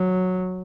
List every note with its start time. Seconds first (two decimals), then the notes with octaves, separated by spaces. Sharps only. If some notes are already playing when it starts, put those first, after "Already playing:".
Already playing: F#3